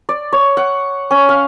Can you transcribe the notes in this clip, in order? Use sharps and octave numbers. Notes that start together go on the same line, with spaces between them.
D5
C#5
F#5
C#4
F5